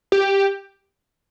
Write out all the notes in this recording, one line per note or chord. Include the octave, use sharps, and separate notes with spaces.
G4